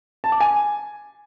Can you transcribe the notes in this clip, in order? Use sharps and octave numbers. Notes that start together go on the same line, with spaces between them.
A5
D6
G#5